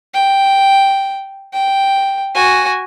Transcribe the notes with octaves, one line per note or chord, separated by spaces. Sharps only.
G5
G5
F#4 G#5